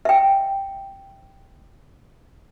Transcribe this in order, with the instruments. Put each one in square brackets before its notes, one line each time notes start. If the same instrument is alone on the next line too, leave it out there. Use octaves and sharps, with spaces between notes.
[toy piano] E5 G5